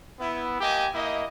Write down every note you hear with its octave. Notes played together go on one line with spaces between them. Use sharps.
B3 E4
A#3 G4 D#5 G#5
A#3 E4 D#5